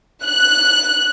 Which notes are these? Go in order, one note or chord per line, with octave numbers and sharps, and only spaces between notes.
F#6